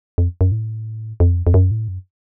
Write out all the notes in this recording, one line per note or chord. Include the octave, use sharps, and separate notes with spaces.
F2
F#2
A2
F2
F2
F#2
A2
F#2